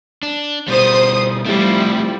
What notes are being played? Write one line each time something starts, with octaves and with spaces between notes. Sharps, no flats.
D4
B2 G3 C5 D#6
F3 G3 A3 C4 E4